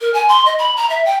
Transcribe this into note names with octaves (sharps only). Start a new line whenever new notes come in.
A#4
G#5
C6
D#5
B5
A#5
E5
G5